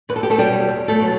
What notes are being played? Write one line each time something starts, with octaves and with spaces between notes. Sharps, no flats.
E2 B4
A4
G4
A3 A4
B2 F#3 G3 G4
E2
A3 A4
B2 F#3